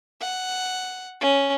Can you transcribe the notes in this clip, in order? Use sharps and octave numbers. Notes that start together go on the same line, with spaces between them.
F#5
C#4